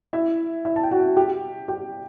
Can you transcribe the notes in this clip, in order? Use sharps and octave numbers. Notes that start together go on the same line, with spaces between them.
E4 E5
E4 E5
A5
G5
F#4 F#5
G4 G5
G4 G5